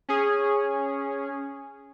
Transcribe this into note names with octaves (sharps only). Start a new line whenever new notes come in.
C#4 G#4